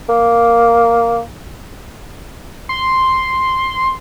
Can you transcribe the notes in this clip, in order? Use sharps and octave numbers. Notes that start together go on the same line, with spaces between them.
A#3
C6